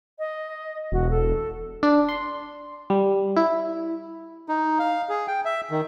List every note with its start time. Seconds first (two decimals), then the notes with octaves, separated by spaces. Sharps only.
0.19 D#5
0.92 E1 F#4
1.10 A4
1.83 D4
2.09 C6
2.90 G3
3.37 E4
4.49 D#4
4.79 F5
5.09 G#4
5.28 G5
5.45 E5
5.71 D#3